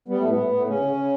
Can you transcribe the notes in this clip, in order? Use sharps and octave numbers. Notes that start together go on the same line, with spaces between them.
G3 B3
A2 A3
B3
A2
A2
C#3 C#4
C#3
C#3